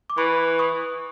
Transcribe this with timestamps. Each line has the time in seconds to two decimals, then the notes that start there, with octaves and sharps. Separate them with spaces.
0.10 D6
0.18 E3 B5 C#6
0.59 C#6 D#6